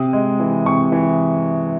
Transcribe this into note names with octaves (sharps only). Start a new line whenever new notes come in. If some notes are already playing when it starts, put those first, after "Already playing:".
Already playing: C3 D#6
G#3
E3
C3 C#6
E3